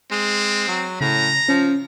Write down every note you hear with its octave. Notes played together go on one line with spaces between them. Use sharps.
G#3 C4
F#3
A2 C#3 A#5
F3 C#4